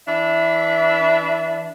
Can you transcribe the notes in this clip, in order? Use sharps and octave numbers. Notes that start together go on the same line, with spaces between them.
E3 D4 E5